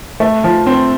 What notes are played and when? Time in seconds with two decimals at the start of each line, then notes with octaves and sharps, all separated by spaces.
0.20 A3
0.44 F3
0.67 C4